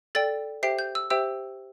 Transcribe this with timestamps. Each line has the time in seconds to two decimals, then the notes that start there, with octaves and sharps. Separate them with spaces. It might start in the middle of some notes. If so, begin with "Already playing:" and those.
0.15 A4 D5 G5 A6
0.63 G4 C5 E5 G5 C7
0.79 G6
0.95 E6
1.10 G4 C5 E5 G5 E6